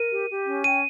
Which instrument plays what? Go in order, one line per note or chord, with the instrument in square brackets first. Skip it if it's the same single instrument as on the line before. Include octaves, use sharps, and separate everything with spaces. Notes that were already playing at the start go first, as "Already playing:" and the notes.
Already playing: [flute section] A#4 [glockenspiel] D#7
[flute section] G4
G4
C#4
[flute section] G5 [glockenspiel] D#7